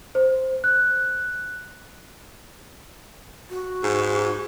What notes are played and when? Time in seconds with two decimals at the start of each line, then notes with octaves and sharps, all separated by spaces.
0.15 C5
0.64 F#6
3.50 F#4
3.83 G#2